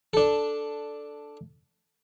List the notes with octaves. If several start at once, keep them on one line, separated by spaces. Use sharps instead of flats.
D4 A4